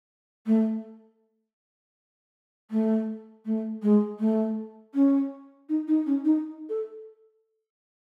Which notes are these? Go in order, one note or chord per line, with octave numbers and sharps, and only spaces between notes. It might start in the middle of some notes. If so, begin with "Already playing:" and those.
A3
A3
A3
G#3
A3
C#4
D#4
D#4
C#4
D#4
A4